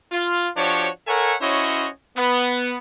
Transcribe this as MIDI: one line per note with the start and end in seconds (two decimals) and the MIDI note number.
0.12 0.49 65
0.57 0.89 53
0.57 0.89 62
0.57 0.89 66
0.57 0.89 67
0.57 0.89 73
1.07 1.35 69
1.07 1.35 70
1.07 1.35 73
1.07 1.35 76
1.07 1.35 78
1.07 1.35 80
1.41 1.88 61
1.41 1.88 64
1.41 1.88 66
1.41 1.88 72
1.41 1.88 73
1.41 1.88 75
2.17 2.77 59